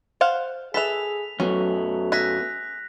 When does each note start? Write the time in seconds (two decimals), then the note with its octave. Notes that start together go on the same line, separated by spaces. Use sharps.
0.21 C5 F5 F#5
0.74 G#4 A4 B4 E5 B6 F7
1.40 F#2 F#3 A3 B3 C#4
2.12 G#4 E5 F#6 A#6 B6